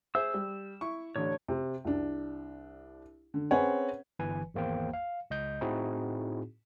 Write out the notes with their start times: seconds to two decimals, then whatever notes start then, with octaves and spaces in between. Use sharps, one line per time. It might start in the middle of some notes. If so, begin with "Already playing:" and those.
0.15 G#4 C5 E5 E6
0.34 G3
0.81 E4 C#6
1.16 A1 D3 C#5
1.48 C3
1.85 C2 D4
3.34 D3
3.51 C4 C#4 G#4 B4 C#5 F#5
4.19 G1 E3 B4 G#5
4.54 G#1 E2 A#3 C5 G5
4.94 F5
5.31 C#2 D#5 G6
5.61 A2 C4 D#4 E4 F#4 G#4